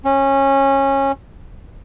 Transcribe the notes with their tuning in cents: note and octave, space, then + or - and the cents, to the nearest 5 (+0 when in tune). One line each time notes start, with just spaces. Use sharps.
C#4 -20